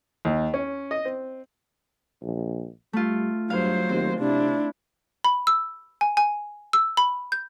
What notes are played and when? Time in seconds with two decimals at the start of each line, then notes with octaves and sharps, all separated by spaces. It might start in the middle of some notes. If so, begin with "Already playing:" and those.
0.25 D#2
0.54 C#4
0.91 D#5
1.05 C4
2.22 A#1
2.93 G3 A3 F4
3.50 G2 F#3 C5 F5
3.89 D#2 C4
4.20 C3 D4 E4
5.24 B5
5.47 E6
6.01 G#5
6.17 G#5
6.73 E6
6.97 B5
7.32 G6